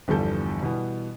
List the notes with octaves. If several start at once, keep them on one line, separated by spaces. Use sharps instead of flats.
G1 E2 F3 G3 A4 G6
B2 E3 G3 B3